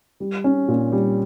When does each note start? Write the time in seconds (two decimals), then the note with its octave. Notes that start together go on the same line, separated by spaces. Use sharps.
0.20 G3
0.44 C#4
0.68 A#2
0.92 G3